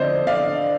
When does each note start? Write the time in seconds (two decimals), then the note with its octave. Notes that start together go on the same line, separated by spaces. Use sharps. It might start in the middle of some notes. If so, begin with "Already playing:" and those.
Already playing: D3 F3 C4 C5 D5 D#5
0.27 D5 F5